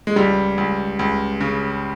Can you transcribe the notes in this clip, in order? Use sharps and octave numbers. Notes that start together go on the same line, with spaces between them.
G#3
C#2 G3
C#2
C#2
C#3